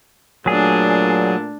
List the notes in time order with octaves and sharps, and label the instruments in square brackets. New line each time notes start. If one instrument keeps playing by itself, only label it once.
[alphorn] A#2 [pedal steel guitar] F#3 G#4 [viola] A3 D4